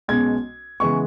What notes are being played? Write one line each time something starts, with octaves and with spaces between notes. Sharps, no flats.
B1 B2 G#3 C#4 G#6
C#3 E3 G#3 B3 C#6